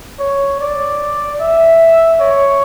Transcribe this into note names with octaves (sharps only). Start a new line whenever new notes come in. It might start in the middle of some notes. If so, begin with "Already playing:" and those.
C#5
D5
E5
C#5